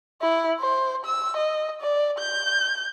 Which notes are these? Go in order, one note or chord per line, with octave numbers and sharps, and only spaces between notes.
E4
C5
E6
D#5
D5
G6